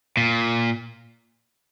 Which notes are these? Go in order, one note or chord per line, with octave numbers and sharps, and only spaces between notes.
A#2